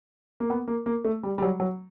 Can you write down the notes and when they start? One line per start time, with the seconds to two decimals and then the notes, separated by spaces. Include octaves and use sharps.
0.40 A#3
0.50 B3
0.68 A#3
0.86 A#3
1.05 A3
1.23 G3
1.38 G3
1.42 F#3
1.60 F#3